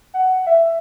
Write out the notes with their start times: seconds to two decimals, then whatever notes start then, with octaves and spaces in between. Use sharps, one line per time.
0.14 F#5
0.47 E5